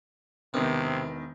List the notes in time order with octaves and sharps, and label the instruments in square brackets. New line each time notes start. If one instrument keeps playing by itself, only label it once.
[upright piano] E1 D#3 [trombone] C3 [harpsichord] B3